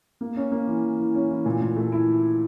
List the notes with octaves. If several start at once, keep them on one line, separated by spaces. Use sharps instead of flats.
A#3
C#4
A#3
E3
E3
E3
C#4
E3
A#2
A#2
A3
E4